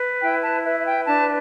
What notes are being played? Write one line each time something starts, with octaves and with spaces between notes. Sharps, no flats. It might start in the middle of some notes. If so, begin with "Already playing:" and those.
Already playing: B4
E4 G5
A5
B4 E5
E5
G5
D4 A5